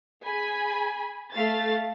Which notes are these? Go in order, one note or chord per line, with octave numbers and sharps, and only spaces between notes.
G#4 G#5 B5
A3 F5 A6